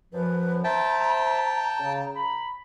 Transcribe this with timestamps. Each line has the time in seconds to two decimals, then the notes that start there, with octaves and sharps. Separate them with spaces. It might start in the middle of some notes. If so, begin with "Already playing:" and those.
0.13 F#2 F3 B4
0.64 C5 E5 G5 A5 A#5
1.79 C#3
2.16 A#5 B5